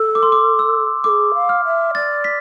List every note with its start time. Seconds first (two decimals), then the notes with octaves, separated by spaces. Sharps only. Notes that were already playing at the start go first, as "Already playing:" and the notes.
Already playing: A4
0.15 D6
0.23 C6
0.32 D6
0.59 E6
1.04 A4 D6
1.09 G#4
1.34 F5
1.49 F6
1.65 E5
1.95 D5 A6
2.24 B6